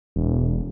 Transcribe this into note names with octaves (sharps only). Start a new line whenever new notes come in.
E1